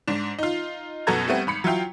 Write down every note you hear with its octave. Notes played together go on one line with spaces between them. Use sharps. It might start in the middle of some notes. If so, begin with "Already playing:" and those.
G#2 D4
D#4 F4
F#2 B2 B3 A4 A#5 G#6
G3 A3 B3 C4
G#1 B5 C#7
F#3 E4 F4 G5